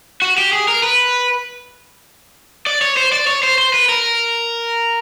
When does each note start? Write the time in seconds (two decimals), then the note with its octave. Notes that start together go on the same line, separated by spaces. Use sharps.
0.22 F#4
0.38 G4
0.53 G#4
0.68 A#4
0.83 B4
2.67 D5
2.81 C#5
2.97 C5
3.12 D5
3.27 C#5
3.43 C5
3.58 C5
3.74 B4
3.89 A#4